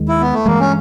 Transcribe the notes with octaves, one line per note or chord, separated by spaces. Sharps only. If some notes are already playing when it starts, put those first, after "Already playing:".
Already playing: D#2 D#3 G#3
E4
B3
A3
G2 E3 G#3 A#3
C#4